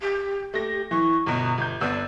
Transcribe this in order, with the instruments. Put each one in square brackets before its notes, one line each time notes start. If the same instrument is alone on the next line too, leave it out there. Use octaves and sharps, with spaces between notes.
[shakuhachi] G4
[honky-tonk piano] A3 A#6 [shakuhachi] G4
[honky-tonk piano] E3 [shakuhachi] C#6
[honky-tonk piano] G1 B2 [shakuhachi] A#5
[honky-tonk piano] G1 G6
[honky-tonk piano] G1 B3 E6 [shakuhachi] D5